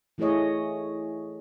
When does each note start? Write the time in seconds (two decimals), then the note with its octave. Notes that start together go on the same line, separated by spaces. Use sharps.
0.18 E3 A3 E4 G#4 C#5 D#5